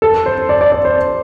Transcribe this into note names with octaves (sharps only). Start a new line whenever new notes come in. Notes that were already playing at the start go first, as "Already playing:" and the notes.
A4
C5
D5
D5
D5
C5